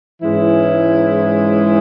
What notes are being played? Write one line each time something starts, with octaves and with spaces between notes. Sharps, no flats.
G#2 E3 G#3 C#4 E4